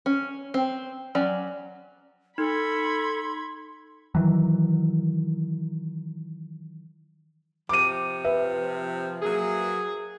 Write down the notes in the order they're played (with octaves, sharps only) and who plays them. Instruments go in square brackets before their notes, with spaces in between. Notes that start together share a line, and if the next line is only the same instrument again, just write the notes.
[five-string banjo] C#4
C4
F#3 C#4 D5
[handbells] D#4 [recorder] A4 [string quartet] B5 G#6 [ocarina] C6
[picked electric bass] D#3 E3 F#3
[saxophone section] C3 F3 [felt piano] D6 D#7
[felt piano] B4 E5
[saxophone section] F#3 A#3 [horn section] G#4